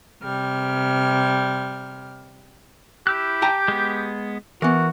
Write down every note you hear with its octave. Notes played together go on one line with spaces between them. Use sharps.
C3 G3 F6
E4 G4 E6 F#6
G5 A5 A#5
G#3 B3
E3 B3 F#4 A#4